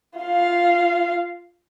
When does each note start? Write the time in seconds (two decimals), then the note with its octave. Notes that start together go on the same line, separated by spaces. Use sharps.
0.19 F4 F5